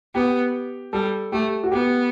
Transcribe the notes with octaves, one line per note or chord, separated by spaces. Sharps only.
B3 G4
G3 A4
A3 G4
F#4
B3 G4